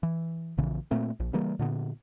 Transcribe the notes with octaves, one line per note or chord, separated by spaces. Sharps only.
E3
A#1 C#3 E3
A#2 A3 A#3 C4
A#1
C#3 E3 G3 A#3
A#2 D3 B3